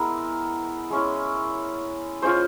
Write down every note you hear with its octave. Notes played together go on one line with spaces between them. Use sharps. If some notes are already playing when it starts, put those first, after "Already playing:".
Already playing: G#3 B3 E4 A#4
G#3 C#4 E4
G#3 C#4 F4 C5